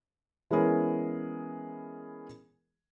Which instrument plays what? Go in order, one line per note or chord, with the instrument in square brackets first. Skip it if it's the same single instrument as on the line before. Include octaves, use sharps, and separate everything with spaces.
[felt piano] E3 G#3 B3 C#4 G#4 A#4